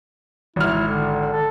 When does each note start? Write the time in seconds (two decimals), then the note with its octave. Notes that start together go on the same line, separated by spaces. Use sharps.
0.56 G#1 E4 F6
0.87 D3
1.33 A4